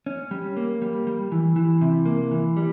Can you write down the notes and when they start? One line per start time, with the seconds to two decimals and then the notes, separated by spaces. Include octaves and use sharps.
0.06 C#4
0.31 G3
0.57 A#3
0.82 G3
1.07 G3
1.32 E3
1.56 E3
1.81 C3
2.05 A#3
2.31 E3
2.57 G3